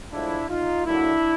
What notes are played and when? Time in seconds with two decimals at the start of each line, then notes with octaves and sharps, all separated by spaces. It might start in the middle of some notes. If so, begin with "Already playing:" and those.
0.12 A2 F3 G#3 D4 E4
0.49 D#4 F4
0.86 D3 F#3 A#3 D4 E4